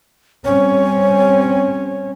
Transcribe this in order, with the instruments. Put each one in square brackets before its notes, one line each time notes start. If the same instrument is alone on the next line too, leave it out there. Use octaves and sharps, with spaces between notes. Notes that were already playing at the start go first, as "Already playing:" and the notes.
[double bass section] G3 C4 C#4 [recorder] C#5